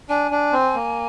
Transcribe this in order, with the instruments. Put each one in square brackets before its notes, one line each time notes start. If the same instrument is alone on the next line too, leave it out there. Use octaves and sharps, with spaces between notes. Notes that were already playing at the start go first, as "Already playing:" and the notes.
[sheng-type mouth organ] D4 [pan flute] G#5
[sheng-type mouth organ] D4
C4
A#3